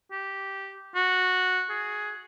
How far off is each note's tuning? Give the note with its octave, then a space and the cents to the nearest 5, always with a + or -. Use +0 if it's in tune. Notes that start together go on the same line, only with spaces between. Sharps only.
G4 -10
F#4 -10
G#4 +10